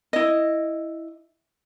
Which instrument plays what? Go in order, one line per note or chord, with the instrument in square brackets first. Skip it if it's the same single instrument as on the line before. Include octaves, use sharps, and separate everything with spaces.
[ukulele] E4 D#5